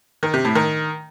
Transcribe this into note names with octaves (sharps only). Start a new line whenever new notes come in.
D#3
C3
A2
D#3